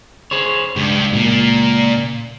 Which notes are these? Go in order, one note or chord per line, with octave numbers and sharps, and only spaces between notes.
G#4 C5 C#5
C#2 G2
A#2